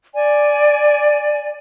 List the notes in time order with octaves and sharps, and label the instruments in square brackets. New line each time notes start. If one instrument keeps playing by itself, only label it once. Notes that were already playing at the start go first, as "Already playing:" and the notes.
[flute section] D5 G#5